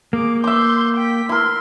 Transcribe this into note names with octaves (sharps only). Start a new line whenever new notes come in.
A#3 G#4 D6
E5 C6 D6 G6
G5 B6
E4 A#4 C6